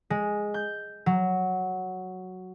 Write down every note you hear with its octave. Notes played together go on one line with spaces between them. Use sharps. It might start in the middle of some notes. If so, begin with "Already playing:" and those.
G#3
G6
F#3